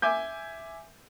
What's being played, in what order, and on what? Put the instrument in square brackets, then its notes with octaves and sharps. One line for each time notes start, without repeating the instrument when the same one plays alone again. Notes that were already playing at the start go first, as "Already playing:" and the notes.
[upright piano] E5 G#5 D6 G6